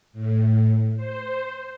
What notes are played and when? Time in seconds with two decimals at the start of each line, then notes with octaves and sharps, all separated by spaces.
0.13 A2
0.96 C5